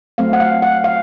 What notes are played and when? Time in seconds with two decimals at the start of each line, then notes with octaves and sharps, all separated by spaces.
0.18 F#3 A3 C4 F5
0.33 F#5
0.40 F5
0.62 F#5
0.84 F5